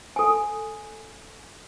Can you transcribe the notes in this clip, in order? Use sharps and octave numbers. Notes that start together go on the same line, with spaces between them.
A4 G#5